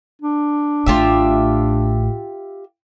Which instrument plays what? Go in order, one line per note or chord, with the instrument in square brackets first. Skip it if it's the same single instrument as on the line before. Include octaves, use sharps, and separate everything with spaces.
[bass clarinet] D4
[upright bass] A1 A2 [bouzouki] F4 G4 E5